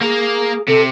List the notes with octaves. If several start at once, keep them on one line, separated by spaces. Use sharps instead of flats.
A#3 G#4 A#4
C3 A4